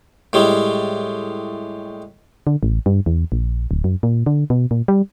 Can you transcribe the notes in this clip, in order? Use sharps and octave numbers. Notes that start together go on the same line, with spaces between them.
A2 G3 G#3
D3
A1
G2
E2
A#1
D1
F#2
A#2
D3
B2
A#2
G3